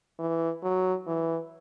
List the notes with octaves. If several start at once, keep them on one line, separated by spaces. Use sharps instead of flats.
E3
F#3
E3